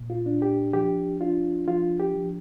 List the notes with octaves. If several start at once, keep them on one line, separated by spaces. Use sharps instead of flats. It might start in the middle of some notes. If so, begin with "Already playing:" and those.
Already playing: A#2
F4
D4
G4
F3 G4
D4 F4
F3 F4
G4
F3